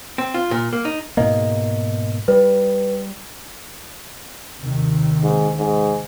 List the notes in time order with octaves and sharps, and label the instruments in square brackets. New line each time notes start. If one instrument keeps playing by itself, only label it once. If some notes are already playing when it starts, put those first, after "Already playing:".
[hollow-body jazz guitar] C4
F4
A#2
A#3
D#4
[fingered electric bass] G#2 B2 A#3 [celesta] D#5
[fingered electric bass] G3 [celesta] B4
[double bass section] D#2 C3 D#3
[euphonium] G#2
G#2